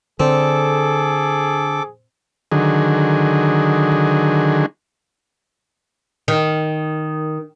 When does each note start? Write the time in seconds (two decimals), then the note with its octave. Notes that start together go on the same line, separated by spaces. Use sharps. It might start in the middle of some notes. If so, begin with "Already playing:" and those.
0.20 D3 C4 G#4 A4 D6
2.52 D3 D#3 F#3 G#4
6.28 D#3